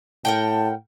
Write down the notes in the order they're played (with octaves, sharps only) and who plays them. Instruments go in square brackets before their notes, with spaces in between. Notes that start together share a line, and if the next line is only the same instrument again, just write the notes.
[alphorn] A2 [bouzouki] A#4 F#5 G5 [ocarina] A5